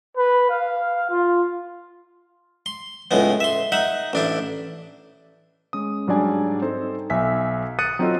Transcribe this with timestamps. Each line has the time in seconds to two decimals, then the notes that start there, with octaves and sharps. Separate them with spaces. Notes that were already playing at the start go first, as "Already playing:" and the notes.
0.17 B4
0.50 F5
1.10 F4
2.66 C6
3.11 C#2 A2 G#3 B3
3.40 E5 C6
3.72 D#4 E5 F#5
4.13 A1 D4 E4
5.73 G#3 C#4 D#6
6.07 G#2 F#3 G3 D4 D5 G#5
6.62 C4 D#4 A4 C5
7.10 B1 E5 G#5 B6
7.79 D#6 F#6 A6 C#7 D#7
7.99 F#3 C4 D#4 F4 A4 D#5